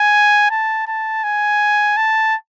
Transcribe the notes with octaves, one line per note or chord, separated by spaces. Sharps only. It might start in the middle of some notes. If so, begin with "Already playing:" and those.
Already playing: G#5
A5
A5
G#5
A5